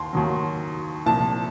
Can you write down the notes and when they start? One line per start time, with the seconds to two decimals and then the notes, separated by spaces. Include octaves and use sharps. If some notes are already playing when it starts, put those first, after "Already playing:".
Already playing: D#2 C6
0.13 D#2 D#3 F#3
1.06 C2 A#2 F3 A5